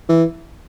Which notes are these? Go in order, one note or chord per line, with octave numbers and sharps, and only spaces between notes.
E3